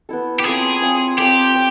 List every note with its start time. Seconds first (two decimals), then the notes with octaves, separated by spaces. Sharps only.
0.09 B3 E4 A4
0.40 G4
0.44 C4 F4 G#4 A4 C#5
0.82 C4 F4 A4 C#5
1.18 C4 F4 G4 A4 C#5
1.55 C4